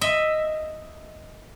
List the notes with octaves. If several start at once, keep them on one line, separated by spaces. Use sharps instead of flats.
D#5 E5